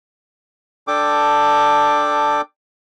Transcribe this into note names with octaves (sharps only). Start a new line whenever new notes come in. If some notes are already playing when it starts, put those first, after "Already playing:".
D4 A4 G5 D6